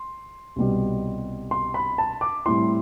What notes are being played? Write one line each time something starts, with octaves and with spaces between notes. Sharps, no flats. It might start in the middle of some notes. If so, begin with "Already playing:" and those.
Already playing: C6
C2 B2 G3
C6
B5
A5
D6
A2 G3 C4 E4 C6